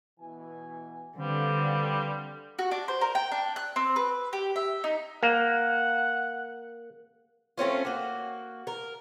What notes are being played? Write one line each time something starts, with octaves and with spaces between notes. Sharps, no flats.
B2 E3 G#5
D3 G3 C4 B4 F5
F#4
D4
C5
A#4
G5
D4
F#6
C4
B4
G4
E5
D#4
A#3 F#5
A3 C4 C#4 F4
A#3 F#4
A#4